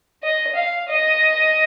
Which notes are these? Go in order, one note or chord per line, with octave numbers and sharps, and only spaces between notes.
D#5
F5
D#5